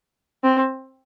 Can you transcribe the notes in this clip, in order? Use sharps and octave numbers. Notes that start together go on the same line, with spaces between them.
C4